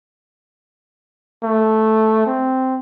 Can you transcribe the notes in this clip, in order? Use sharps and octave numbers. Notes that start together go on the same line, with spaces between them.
A3
C4